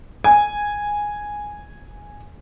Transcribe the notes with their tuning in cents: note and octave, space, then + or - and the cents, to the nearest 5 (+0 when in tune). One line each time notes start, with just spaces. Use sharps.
G#5 -5